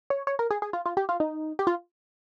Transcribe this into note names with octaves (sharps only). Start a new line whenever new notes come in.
C#5
C#5
A#4
G#4
G#4
F4
F4
G4
F4
D#4
G4
F4